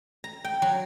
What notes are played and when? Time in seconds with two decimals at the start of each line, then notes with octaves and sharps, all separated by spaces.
0.24 A#5
0.45 G5
0.62 F#3